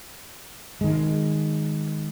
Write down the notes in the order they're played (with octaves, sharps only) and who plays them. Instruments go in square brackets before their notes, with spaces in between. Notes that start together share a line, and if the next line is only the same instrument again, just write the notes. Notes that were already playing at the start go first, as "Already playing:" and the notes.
[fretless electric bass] D#3 G#3